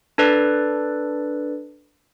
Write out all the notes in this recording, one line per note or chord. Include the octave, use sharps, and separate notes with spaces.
D4 A4 B4 D5